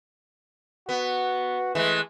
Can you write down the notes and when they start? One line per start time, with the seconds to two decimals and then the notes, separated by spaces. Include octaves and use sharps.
0.89 B3 F#4
1.75 E3 G#3 A3